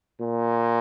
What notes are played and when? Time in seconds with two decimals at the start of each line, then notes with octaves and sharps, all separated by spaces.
0.21 A#2